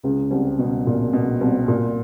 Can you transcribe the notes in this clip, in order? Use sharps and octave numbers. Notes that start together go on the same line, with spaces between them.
C#2 C#3
C2 C3
B2
A#2
B2
C2 C3
A#2